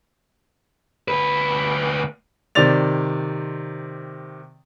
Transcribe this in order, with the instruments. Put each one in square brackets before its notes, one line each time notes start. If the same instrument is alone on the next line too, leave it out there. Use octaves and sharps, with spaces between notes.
[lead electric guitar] D2 B4
[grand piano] C3 D#3 C5 D5 A6 F7